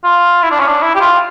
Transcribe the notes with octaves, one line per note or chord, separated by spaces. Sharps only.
F4
E4
D4
C#4
D4
E4
G4
F4